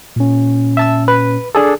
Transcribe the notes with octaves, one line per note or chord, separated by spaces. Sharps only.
A#2 C#4
E5 A5 E6
B4
D4 G#4 A4